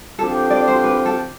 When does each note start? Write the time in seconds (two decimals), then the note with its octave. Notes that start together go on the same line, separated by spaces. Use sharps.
0.19 D3 F3 C4 G4 A4
0.50 D5
0.68 C5
0.84 B4
1.05 A4